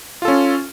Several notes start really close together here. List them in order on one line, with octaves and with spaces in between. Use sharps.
F4 A4 C#4